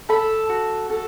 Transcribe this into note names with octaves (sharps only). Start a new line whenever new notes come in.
A4 B5
F#4
A4